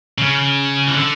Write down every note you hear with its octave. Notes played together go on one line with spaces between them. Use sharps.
C#3
E3
D3